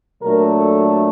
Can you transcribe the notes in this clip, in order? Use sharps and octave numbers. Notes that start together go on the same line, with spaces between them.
A#2 F#3 A3 D4 A#4
A4